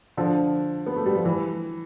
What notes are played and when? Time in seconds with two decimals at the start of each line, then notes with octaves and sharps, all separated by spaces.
0.17 D3 F3
0.86 B3
0.96 A3
1.06 G3
1.15 F3
1.25 E3